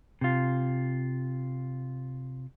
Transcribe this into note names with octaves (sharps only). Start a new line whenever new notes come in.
C3 F4